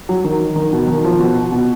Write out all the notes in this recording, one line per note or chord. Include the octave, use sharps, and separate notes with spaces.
F#3
D#3
D#3
B2
D#3
F3
B2
B2